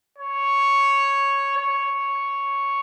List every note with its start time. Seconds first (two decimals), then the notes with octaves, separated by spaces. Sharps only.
0.18 C#5
1.57 C#5